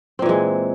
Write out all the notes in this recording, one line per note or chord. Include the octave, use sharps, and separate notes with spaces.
A#2 E3 G#3 C4